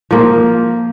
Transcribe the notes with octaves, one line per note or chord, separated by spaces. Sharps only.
F3 A#3